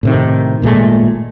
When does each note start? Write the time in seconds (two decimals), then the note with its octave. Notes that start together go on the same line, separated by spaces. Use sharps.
0.03 A2 C3 D#3
0.62 G#1 A#2 G#3 A3